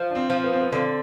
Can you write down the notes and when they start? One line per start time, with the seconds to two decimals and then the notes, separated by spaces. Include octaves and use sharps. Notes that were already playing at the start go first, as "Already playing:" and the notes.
Already playing: F3
0.10 D4
0.15 C4
0.30 F3
0.44 B3
0.53 C4
0.61 B3
0.72 D3 C4